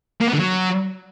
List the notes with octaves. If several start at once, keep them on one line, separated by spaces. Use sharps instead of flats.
A#3
B3
D3
F#3